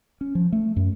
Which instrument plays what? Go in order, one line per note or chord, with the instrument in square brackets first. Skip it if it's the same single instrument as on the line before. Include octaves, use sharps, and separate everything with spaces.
[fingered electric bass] C#4
F3
A3
F#2